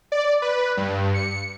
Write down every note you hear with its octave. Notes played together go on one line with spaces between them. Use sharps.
D5
B4
G2
C#7